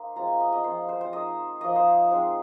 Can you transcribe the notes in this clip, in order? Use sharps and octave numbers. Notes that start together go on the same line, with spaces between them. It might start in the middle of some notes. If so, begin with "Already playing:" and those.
Already playing: A#3 D#4 C5
G#3 C4 F4 A#5
G#5
D#5
D#5
F3 C4 F4 C5
C5
C5
G#3 D#4 D#5
F3 A#3 D#4 D#5
C5
G#3 C4 D#4